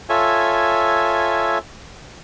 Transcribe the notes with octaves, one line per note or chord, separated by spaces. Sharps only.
F4 A4 C#5 E5 G#5